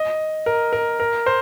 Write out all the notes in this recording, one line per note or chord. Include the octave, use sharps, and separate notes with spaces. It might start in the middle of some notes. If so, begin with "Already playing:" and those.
Already playing: D#5
A#4
A#4
A#4
C5